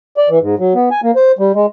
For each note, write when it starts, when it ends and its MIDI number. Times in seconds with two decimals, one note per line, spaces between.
0.17 0.29 74
0.29 0.39 52
0.41 0.55 44
0.59 0.74 54
0.74 0.89 59
0.91 1.01 80
1.03 1.11 58
1.16 1.32 72
1.39 1.52 55
1.55 1.66 56